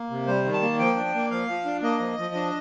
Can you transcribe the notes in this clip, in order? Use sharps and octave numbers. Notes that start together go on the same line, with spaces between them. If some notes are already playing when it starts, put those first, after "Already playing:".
Already playing: A#3
C3
G3 C5
D#3
A5
A#3
F3 G5
D4
A#3
F3 F5
F3
D4
A#3 D#5
F3
F3
D4